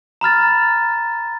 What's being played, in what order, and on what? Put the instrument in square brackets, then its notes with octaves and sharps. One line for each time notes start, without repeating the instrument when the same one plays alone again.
[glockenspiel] A#5 B5 F6 A6